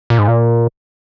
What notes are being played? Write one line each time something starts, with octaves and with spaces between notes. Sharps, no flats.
A#2
G#2
A#2